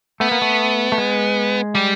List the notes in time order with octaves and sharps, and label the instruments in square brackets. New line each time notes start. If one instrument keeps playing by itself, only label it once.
[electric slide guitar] A3 [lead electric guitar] B3
[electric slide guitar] A#3
A3
A3
G#3
[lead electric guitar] G3